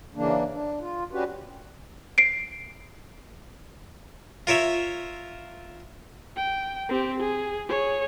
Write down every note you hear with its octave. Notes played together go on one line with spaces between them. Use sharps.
C#3 E3 A#3 D4
D4
F4
C#4 D4 F#4 G4 B4
C7 D7
F4 A#4 C#5 E5
G5
C4 G4
G#4
G#4 C#5